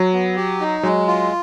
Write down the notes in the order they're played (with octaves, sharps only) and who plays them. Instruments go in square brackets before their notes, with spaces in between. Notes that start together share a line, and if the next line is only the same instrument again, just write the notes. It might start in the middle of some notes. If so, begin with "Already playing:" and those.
Already playing: [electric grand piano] F#3
[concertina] B3
G4
D#4
[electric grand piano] F#3 [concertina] G#3
[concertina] F4